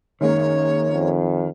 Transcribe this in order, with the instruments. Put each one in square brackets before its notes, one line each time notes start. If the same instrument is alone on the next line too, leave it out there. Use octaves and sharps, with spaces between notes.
[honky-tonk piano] F#2 G#3 A#3 [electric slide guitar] D#3 [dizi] C#5
[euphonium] F2